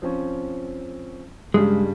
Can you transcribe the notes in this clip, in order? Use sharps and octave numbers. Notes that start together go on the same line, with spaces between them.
F3 C4 C#4
G2 C#3 G3 G#3